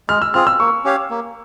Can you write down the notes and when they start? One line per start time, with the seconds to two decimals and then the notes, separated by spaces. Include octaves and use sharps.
0.09 G#3 F6
0.22 E6
0.34 C4 F4 G#4 F6
0.47 E6
0.60 A#3 C#6
0.84 C#4 G4 C#5 F5
1.10 A#3